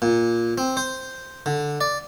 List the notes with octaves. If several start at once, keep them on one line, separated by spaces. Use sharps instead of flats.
A#2
C4
C5
D3
D5